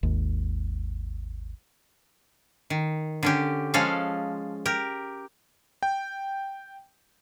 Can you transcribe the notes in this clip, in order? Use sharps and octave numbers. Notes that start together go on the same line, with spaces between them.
G#1 D#2
D#3
D3 C#4 G4
F3 G#3 C#4 A4 F5
G4 A#4
G5